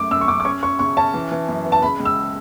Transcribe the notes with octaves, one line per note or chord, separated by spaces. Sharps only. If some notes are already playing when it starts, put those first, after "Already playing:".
Already playing: F#2 A3 D6
F#2 E6
C#6
F#2 D6
D6
C#4 C#6
C#4 C#6
C#3 C#6
C#4 A5
E3
E3
F#2
B3
A5
C#3 B5
C#2
E6